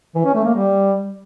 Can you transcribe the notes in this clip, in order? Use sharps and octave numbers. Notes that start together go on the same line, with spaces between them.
E3
C#4
A3
A#3
G3